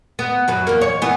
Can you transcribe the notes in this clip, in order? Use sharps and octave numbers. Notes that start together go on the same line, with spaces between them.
B3
F#2 F#3 B4
E2 A#3
C#5
E3 B3